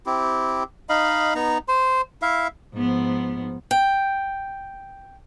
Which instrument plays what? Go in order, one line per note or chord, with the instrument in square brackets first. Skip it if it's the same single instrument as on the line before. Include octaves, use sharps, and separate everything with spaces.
[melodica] C4 E4 G4
D#4 D#5 F5 B5
B3 D#4 A#5
C5 C6
E4 E5 F5
[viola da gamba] G#2 F3 B3
[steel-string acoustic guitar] G5